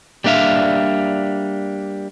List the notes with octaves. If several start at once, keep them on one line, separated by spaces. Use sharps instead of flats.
G3 A#3 D4 E5 F5